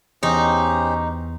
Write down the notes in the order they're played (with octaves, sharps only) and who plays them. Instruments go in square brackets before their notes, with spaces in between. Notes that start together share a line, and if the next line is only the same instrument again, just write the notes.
[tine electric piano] E2 [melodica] C#4 G4 C5 [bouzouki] D#4